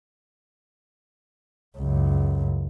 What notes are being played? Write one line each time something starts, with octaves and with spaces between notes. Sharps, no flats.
C#2 F#2